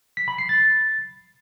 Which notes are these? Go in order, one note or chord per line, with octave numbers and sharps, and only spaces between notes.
B6
B5
C7
A6